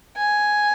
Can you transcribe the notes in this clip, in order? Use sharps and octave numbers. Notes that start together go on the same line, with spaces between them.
G#5